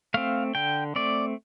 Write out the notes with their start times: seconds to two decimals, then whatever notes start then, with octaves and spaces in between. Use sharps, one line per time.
0.14 A3 C4 F5
0.55 D3 G5
0.96 A3 C4 D5